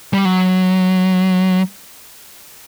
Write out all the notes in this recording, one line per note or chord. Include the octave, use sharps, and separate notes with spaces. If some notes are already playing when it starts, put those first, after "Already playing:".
G3
F#3